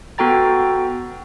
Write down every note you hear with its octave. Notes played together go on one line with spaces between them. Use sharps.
B3 F#4 A4 G5 A#5 A6